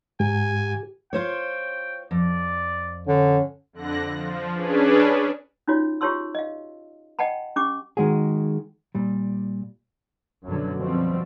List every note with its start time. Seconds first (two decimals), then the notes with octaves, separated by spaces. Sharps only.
0.20 G#2 G4 G#5
1.13 F4 C5 C#5 G5
2.11 F2 D5
3.07 D3 C#4
3.73 F2 D3 F#6 A#6
4.10 F3
4.54 C#4 D4 G#4 B4
5.68 C#4 D#4 F4 F#4 C#5
6.01 F4 G4 C#5 A5 C6 E6
6.35 D#5 F5
7.19 D#5 F#5 G5 A5 B5
7.56 C#4 G4 D6
7.97 D#3 G#3 F#4 G#4
8.95 A#2 G3
10.45 F#2 B2 D3 F#3
10.79 B2 F3 G3 C4